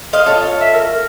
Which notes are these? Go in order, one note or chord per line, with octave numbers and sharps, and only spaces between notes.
C5 D#5 F5
F4 A4 C#5
E5
A#4